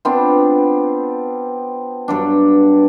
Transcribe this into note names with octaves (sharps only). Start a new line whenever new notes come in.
B3 C4 D4 F4
G2 F#3 D4